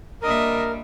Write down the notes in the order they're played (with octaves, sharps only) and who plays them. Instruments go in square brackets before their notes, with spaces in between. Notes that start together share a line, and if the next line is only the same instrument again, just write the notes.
[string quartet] A#2 G3 D4 [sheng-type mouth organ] A#4 [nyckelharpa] D#5 E5